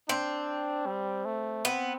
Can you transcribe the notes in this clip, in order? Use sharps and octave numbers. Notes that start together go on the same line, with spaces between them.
C4 D4
G3
A3
B3 C4